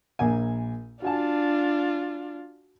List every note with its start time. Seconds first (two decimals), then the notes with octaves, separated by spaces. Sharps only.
0.19 A#1 A#3 G#5
1.02 D4 F4 F#4 G#5 A5